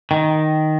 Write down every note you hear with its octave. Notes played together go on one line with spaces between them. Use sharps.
D#3